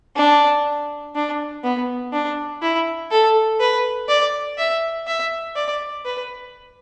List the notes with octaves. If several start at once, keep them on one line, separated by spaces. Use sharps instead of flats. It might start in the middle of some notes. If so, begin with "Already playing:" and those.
D4
D4
B3
D4
E4
A4
B4
D5
E5
E5
D5
B4